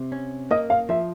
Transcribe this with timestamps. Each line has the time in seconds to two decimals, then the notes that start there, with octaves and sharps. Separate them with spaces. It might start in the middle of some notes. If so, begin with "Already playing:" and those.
Already playing: C3
0.12 C#4
0.51 A#3 D#5
0.70 F5
0.89 F3 E5